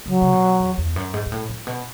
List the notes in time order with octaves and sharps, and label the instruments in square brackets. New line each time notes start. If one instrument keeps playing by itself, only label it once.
[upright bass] C#3 [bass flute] F#3
[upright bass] C#3
B2
E2
E2
F#2
G#2
G#2
A2
A2
B2